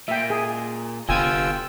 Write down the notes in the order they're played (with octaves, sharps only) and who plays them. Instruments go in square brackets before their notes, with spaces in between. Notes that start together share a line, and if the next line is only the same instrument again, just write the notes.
[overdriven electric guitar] A#2 [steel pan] E5 G5
[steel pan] G#4
[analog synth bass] F1 [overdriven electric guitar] D3 B3 [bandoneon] F4 G5 E6 [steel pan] G#5